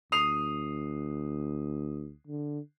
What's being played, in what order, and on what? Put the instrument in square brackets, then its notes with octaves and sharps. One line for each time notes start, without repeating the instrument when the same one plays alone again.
[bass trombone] D2 [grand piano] D#6 C7 F7
[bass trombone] D3